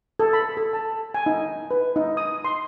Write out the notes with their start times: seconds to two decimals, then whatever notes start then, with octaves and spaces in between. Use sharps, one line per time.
0.19 A4
0.33 B5
0.57 A4
0.73 A5
1.14 G#5
1.26 D#4
1.71 B4
1.96 D#4
2.17 D#6
2.45 C6